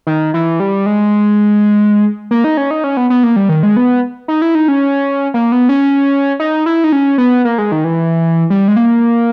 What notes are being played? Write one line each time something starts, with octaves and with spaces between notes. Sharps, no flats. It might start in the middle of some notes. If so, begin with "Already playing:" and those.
D#3
E3
G3
G#3
A#3
D#4
C#4
D#4
C#4
B3
B3
A#3
G3
D#3
G#3
B3
D#4
E4
D#4
C#4
A#3
B3
C#4
D#4
E4
D#4
C#4
B3
A#3
G#3
D#3
E3
G3
G#3
A#3